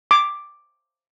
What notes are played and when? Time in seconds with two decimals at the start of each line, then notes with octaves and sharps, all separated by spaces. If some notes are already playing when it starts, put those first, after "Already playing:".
0.11 D6